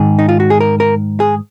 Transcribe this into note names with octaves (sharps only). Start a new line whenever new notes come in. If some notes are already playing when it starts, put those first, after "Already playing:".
Already playing: G#2 D#3 G#4
D#4
F4
F#4
G#4
A#4
A#4
G#4